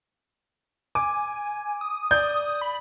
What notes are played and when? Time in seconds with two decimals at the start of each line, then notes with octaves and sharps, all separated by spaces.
0.95 G#5 D6
1.81 D#6
2.11 D5 G6
2.61 B5